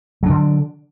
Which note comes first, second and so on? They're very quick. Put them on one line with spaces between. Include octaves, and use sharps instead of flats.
F#3 D4 D3